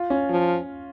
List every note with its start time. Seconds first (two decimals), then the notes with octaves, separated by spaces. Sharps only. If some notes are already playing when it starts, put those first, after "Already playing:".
Already playing: F4
0.10 C#4
0.30 F3